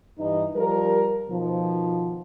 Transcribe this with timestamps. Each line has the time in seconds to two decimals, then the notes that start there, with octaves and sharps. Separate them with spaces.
0.18 G2 E3 D#4
0.55 F3 G3 A#4
1.29 B2 D#3 F3